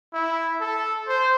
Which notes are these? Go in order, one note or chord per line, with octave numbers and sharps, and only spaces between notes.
E4
A4
C5